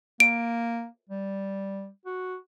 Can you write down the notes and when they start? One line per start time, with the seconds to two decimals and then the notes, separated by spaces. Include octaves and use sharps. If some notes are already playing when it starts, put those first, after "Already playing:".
0.20 A#3 D7
1.10 G3
2.06 F#4